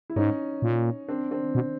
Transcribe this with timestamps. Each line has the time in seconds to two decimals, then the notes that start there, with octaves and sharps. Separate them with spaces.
0.10 E4
0.16 G#2 C#4 D#4
0.62 A#2
1.08 C4 D4
1.31 C4 D4
1.55 B2